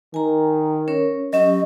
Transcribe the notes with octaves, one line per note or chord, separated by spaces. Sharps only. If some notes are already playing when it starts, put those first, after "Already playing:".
D#3 G#5 A#5
C#4 A#4 C#5
F#3 C#4 G4 D#5